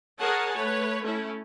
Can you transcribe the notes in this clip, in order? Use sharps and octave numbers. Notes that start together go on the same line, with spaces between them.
G#4 A#4 C#5 F#5 G#5 A5
A3 B4 C#5
A3 C#4 E4